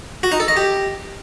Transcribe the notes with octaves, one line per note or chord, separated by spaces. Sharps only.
F#4
D#4
A4
D#5
G4